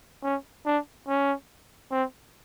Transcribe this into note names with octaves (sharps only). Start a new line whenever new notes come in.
C#4
D4
C#4
C4